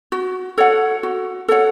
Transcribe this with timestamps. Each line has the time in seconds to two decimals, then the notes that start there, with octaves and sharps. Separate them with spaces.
0.12 F#4
0.58 A4 C#5 F#5
1.03 F#4
1.48 A4 C#5 F#5